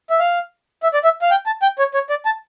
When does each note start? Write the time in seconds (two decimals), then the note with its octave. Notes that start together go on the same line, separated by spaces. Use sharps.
0.10 E5
0.20 F5
0.83 E5
0.94 D5
1.04 E5
1.22 F5
1.31 G5
1.46 A5
1.62 G5
1.79 C#5
1.94 C#5
2.10 D5
2.25 A5